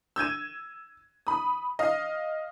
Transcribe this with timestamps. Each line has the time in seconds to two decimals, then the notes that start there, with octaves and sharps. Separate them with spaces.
0.16 E6 G6 G#6 D#7
1.27 B5 D#6
1.79 D#5 F5